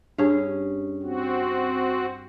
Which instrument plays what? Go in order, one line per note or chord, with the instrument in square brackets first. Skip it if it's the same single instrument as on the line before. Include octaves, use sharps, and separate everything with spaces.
[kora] G2 C#4 G#4
[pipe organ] C4 F#4